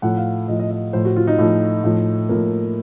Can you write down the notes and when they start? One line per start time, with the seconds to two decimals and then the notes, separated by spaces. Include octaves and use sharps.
0.02 A2 F3 F#5
0.18 F5
0.48 A2 F3 D#5
0.59 D#5
0.71 D#5
0.93 A2 F3 C5
1.05 F#4
1.16 F4
1.27 D#4
1.39 A2 F3
1.84 A2 F3
2.29 A2 F3 A#3